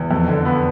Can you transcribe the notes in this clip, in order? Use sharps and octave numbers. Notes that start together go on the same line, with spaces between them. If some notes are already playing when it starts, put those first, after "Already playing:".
Already playing: E2
F2
D3
B3